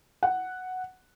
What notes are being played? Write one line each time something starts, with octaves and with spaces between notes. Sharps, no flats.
F#5